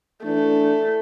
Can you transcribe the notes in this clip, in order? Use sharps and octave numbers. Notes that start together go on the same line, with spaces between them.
E3 A3 D4